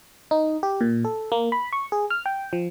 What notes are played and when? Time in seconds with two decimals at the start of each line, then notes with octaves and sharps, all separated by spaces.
0.31 D#4
0.63 G4
0.81 A#2
1.05 A4
1.32 A#3
1.52 B5
1.73 C#6
1.92 G#4
2.10 F6
2.26 G5
2.53 F3